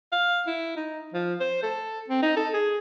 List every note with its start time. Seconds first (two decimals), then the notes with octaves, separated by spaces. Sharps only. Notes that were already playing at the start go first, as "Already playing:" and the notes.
0.12 F5
0.47 E4
0.76 D#4
1.13 F3
1.40 C5
1.63 A4
2.09 C4
2.22 D#4
2.36 A4
2.54 G#4